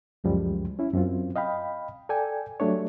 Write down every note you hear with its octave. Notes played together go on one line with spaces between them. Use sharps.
C#2 F#2 F3 G3 G#3
C#4 E4
F#2 C4 F4
D#5 F5 G5 B5
A4 D5 G5 G#5
F#3 G3 A3 D4 C#5